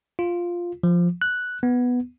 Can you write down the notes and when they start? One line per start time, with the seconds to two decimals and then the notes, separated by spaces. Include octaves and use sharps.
0.19 F4
0.83 F3
1.22 F#6
1.63 B3